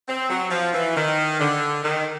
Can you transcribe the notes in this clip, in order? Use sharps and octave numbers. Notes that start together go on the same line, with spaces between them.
C4
F#3
F3
E3
D#3
D3
D#3